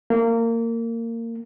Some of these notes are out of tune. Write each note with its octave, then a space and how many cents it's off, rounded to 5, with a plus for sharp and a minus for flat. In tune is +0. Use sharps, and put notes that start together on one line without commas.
A#3 -25